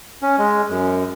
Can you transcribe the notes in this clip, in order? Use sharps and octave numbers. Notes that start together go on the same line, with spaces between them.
C#4
G#3
F#2